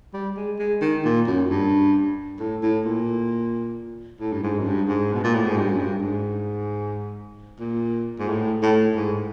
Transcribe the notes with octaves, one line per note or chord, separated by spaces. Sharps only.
G3
G#3
G#3
D#3
A#2
F#2
G2
A2
A2
A#2
A2
G2
G#2
F#2
G2
G#2
B2
A#2
A2
G#2
G2
F#2
G2
G#2
A#2
G#2
A2
A2
G#2